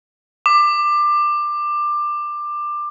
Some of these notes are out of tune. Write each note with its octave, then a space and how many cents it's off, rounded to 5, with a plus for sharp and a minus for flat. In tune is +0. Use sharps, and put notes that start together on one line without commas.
D6 +20